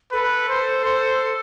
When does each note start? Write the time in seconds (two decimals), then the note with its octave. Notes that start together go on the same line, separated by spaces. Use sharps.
0.12 A4 B4
0.49 C5
0.85 C5